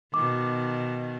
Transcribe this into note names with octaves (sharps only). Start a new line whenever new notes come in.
B2 D#3 D6